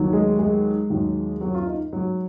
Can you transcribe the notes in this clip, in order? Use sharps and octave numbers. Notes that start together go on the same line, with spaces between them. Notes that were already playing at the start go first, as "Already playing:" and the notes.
Already playing: D#2 D#3 F#3
G#3 G#4
G#3 G#4
D#2 D#3 F#3
F#3 F#4
F4
D#4
G#2 F#3 F#4